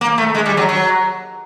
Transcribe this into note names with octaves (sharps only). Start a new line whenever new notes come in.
A#3
A3
G#3
G3
F#3
F#3